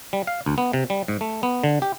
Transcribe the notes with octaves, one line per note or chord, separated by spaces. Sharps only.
G3
F5
D2
B3
C3
G3
G#2
A3
B3
D3
G4